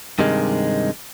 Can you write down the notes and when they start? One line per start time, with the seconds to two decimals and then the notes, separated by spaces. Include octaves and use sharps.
0.19 G2 C3 D#3 G#3